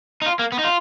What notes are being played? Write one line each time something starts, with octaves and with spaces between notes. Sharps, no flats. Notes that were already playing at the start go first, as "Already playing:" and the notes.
D#4
F4
A#3
B3
D#4
F4